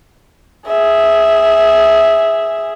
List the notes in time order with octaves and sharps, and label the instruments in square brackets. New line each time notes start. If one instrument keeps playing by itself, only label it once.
[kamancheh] G#4 E5